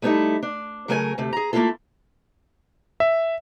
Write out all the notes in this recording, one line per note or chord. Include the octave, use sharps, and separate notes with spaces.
G3 A3 B3 D#4 E4 A4
D4
C#3 F#3 A3 A#4 C5 G#5
D2 C3 A3
G#4 A#5
A3 A#3 C4 E4 F4 A4
E5